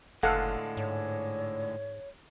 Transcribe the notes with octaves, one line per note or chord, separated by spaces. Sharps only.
F#1 A2 D3 G#3 A4 F5 F#5
G#2 C#5